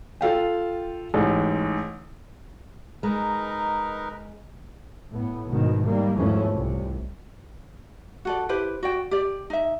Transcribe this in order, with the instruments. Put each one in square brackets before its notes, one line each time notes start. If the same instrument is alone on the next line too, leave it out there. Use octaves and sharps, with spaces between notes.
[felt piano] F4 A4 F5 G5
A1 G#2
[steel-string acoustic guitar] G#3 [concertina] D#4 A#4 B4
[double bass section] A2 B3
G#1 G#2 B2 D#3
D#3 G3 A#3
G#1 E2 E3 F3 A3 C#4
C2 C3
[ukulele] F#4 A4 D5
E4 G4 B4 C5
F#4 D5 G5
G4 D5
D#4 E5